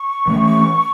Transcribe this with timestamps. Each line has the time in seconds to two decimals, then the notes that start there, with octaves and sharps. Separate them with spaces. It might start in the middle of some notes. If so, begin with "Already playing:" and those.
Already playing: C#6
0.28 E3 A3 C#4